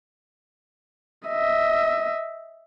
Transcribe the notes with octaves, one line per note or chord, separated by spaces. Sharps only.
D#5 E5